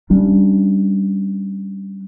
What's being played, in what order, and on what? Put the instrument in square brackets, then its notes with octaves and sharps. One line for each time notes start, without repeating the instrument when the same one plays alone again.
[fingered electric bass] G3 C#4 D4